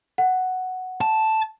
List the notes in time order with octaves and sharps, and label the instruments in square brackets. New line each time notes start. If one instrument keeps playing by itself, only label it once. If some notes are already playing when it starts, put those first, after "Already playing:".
[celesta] F#5
[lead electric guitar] A5